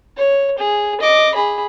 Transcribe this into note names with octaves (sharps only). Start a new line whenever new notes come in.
C#5
G#4
D#5 D6
G#4 B5